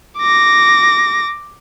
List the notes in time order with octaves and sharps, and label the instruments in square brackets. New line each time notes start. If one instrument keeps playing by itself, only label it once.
[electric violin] D6 A#6